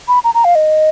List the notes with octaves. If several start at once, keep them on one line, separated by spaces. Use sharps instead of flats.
B5
A#5
A#5
F5
D#5